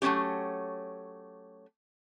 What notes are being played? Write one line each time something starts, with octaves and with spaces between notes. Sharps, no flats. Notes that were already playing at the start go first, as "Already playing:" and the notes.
F#3 A3 A#3 C#4 G4